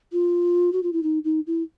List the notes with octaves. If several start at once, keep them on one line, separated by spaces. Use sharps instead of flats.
F4
F#4
F4
E4
D#4
D#4
E4